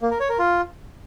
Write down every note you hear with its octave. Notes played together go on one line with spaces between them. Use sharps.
A#3
A#4
C#5
A#4
F4